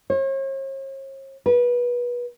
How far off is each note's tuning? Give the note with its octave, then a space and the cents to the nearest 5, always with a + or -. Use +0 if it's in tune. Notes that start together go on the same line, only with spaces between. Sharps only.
C#5 -45
B4 -25